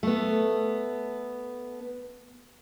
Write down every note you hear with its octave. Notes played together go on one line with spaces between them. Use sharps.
A3 B3